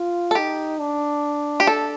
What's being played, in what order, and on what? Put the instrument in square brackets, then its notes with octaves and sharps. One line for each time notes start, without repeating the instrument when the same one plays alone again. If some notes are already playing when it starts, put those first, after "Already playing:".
Already playing: [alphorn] F4
[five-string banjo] A4
[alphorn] D#4 [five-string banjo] G4
[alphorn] D4
[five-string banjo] G4
A4